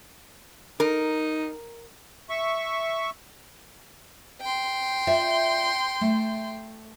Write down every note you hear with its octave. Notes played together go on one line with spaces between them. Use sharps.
D#4 A#4
E5 C#6
G5 C6
F4 D5 E5
A3